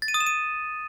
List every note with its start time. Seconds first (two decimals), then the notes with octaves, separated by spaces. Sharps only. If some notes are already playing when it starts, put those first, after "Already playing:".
0.02 A6
0.08 D#7
0.14 D#6
0.20 E7
0.27 D#7